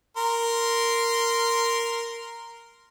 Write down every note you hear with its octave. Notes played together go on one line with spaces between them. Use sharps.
A#4 C6